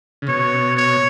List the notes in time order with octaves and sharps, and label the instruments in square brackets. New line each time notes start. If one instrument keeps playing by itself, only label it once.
[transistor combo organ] C#3
[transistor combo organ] B2 [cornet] C#5
[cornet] C#5